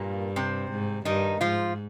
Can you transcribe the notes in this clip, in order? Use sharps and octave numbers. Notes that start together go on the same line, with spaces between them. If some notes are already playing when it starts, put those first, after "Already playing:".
Already playing: G2 A#2 A#3
C3 C4
G#2
G2 D#3 D#4
G#2 F3 F4